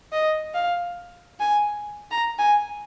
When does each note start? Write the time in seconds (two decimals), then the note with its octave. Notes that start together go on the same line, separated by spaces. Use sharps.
0.12 D#5
0.54 F5
1.40 G#5
2.11 A#5
2.38 G#5